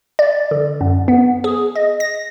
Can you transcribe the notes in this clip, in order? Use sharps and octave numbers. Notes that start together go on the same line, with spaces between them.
D5
D3
F#2
B3
G#4
D#5
A#6